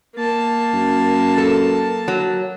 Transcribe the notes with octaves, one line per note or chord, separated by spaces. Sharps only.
A#3 A5
F#2
A4
F#3